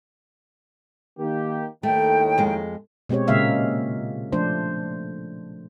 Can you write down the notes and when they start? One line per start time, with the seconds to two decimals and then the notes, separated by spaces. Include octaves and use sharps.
1.18 D#3 A#3 G4
1.83 D#2 A2 D#3 A3 G5
2.38 F2 G#3
3.09 B2 G#3 C4 G4 C#5
3.28 A#2 C#3 G#3 A#3 E5 F5
4.32 F3 A3 D4 C5